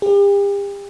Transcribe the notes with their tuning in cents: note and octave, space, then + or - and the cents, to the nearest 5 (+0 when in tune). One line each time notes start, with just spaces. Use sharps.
G4 +40